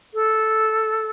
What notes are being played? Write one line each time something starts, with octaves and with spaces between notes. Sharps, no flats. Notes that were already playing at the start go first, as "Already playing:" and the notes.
A4